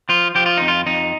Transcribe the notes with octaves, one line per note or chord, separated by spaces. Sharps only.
F3 F4
F3 G4
F4
F2 D#4
F4
F2 D#4